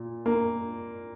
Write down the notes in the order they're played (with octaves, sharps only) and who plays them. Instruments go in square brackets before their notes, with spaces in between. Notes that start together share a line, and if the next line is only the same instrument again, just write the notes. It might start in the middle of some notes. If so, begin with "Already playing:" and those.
Already playing: [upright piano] A#2
A#3